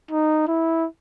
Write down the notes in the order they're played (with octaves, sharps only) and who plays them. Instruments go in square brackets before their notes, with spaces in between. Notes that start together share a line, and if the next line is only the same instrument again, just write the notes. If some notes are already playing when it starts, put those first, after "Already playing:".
[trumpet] D#4
E4